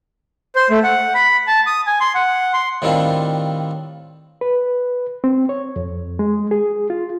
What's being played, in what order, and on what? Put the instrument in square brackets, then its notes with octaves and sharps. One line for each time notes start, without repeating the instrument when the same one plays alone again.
[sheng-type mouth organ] C5
A3
F#5
B5
A5
D#6
G#5
C6
F#5
C6
[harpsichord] A2 D#3 G3 C4 D4 F4
[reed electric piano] B4
C4
C#5
F2
G#3
G#4
F4